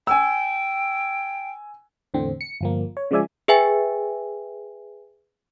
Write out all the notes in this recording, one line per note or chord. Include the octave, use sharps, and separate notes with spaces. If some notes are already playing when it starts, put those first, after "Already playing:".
G5 G#5 E6
E2 A2 D3 C4
C#7
G1 F3 A#3
C#5
C#3 F3 G#3 D5 E5 G#5
G#4 B4 E5 G5 G#5